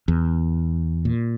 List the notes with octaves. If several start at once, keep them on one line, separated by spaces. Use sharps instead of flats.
E2
A#2